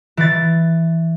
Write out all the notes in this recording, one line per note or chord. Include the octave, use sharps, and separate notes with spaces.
E3 A6